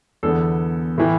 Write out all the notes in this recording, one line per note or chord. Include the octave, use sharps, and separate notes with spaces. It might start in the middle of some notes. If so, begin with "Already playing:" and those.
E2 D3 B3 A4
A2 E3